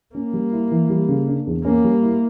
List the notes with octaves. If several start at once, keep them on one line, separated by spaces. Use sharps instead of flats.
A#3 C#4
G3
E4
E3
G3
C#3
D4
E2
A#3 C#4
G3
E4